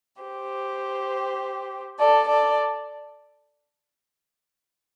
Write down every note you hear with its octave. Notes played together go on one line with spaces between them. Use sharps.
G4 C5
A4 D5
A4 D5